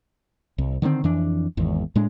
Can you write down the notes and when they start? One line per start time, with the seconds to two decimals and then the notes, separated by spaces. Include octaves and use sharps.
0.58 C2
0.82 D3 D#3 G#3 C4
1.04 F2 E3 D4
1.57 G#1 E2
1.95 A2 G#3 D4